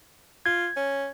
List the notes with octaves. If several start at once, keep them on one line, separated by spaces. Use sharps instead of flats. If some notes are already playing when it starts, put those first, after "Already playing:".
F4 G#6
C#4